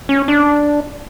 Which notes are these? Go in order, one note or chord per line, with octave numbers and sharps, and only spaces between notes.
C#4
D4